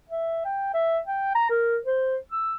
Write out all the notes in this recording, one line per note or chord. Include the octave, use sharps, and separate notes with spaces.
E5
G5
E5
G5
A#5
A#4
C5
E6